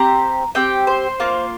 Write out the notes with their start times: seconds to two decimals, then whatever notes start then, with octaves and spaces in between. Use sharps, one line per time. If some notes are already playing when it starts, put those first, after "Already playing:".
Already playing: C4 G4 A#5
0.55 C4 G4 G5
0.87 C5
1.20 A#3 F4